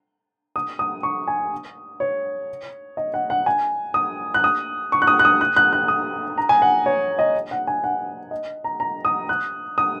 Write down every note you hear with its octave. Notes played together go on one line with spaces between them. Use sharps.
D#6
D#6
C#6
G#5
C#5
D#5
F#5
F#5
G#5
D#6
F#6
D#6
C#6
F#6
D#6
F#6
D#6
F#6
F#6
F#6
D#6
A#5
G#5
F#5
C#5
D#5
F#5
G#5
F#5
D#5
A#5
A#5
D#6
F#6
D#6